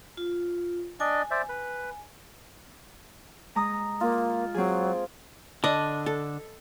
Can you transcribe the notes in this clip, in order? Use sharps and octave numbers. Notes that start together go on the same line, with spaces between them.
F4
D4 D5 D#5 G#5
C5 D5 E5
B4
G#3 A#5 D#6
A#3 F4
F#3 C4 G#4
D3 D4 D#5
A4